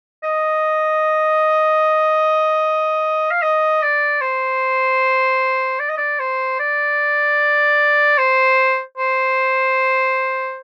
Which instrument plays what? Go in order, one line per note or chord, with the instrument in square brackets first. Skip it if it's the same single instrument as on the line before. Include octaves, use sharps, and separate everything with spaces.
[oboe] D#5
F5
D#5
D5
C5
D5
D#5
D5
C5
D5
C5
C5